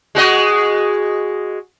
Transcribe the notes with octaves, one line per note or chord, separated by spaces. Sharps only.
G#3 F#4 D#5